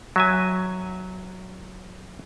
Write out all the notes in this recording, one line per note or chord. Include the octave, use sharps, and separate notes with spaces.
F#3 E5 G#5